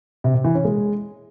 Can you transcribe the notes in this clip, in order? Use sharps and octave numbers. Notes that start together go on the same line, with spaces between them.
C3
C3
E3
C#4
G#3